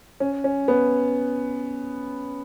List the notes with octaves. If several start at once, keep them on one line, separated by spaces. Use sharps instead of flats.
C#4
C#4
B3